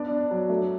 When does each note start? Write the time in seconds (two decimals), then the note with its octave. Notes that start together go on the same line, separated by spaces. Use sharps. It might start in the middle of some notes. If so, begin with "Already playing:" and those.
Already playing: B3 D4 D5
0.11 D4
0.31 F#3
0.49 A3